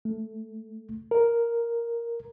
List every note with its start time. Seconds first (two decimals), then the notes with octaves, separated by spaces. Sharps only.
0.05 A3
1.11 A#4